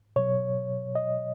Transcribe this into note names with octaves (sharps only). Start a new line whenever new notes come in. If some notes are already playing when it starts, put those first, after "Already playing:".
B2 F#3 C#5
D#5